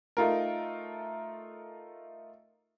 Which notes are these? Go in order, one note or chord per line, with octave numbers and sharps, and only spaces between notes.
A3 D#4 F4 A#4